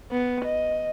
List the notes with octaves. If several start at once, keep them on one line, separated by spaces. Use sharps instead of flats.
B3
D#5